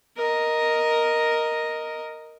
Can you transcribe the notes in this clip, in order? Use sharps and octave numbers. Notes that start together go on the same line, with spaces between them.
A#4 D#5